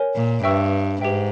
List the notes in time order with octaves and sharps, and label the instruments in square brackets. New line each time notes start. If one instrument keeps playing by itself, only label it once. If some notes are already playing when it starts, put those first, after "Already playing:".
Already playing: [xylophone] A#4 C#5 G#5
[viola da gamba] A#2
[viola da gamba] G2 [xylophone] B4 E5 G5 C#6 E6
[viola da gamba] G#2 [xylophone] G4 B4 E5 G5